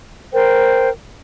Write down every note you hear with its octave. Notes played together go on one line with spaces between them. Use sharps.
A#4 C5 G5